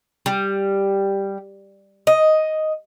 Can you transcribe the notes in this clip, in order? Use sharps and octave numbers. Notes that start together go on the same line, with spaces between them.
G3
D#5